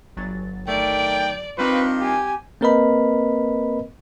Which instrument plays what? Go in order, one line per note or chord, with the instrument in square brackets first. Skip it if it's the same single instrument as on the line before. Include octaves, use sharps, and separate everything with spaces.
[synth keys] G1 F#3 A6
[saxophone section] D#3 A3 [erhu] D5 [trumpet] G5
[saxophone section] D#3 D4 F4 [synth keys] G3 C4 F5 [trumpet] B4 [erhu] C#6
[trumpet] G4 [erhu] G#5
[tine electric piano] A#3 C4 A#4 B4 D#5 B5